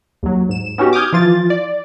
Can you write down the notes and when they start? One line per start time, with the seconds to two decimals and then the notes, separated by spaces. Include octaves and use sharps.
0.23 D#2 F#3
0.49 G#2 E7
0.78 B3 C#4 D#4 F#4 G4
0.93 D6 D#6 F6 G6 G#6
1.13 E3 F3 F4 A6
1.50 D5